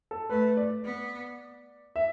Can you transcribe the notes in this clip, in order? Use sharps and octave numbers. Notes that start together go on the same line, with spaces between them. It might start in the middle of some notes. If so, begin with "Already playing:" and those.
A4
A3 B4
D5
B3
E5